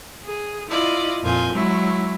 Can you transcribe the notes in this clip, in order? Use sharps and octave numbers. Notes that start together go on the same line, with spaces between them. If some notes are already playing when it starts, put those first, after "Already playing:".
G#4
E4 F4 D5 D#5
F2 A#2 F4 G#5 G6
F#3 G#3 E4